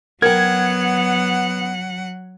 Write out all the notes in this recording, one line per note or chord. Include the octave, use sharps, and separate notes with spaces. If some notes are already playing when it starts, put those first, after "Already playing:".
F#3 B3 A#4 F#5 G5 G#6